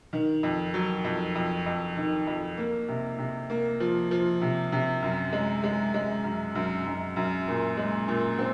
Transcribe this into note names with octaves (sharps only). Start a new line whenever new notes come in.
D#3
F2
F#3
F2
F2
F2
D#3
F2
A#3
C3
C3
A#3
F3
F3
C3
C3
F#2
G#3
G#3
G#3
F#2
F#2
F#2
F#2
A#2
G#3
A#2
C4